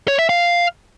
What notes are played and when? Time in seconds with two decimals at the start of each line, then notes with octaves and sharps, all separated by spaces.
0.08 C#5
0.19 E5
0.29 F5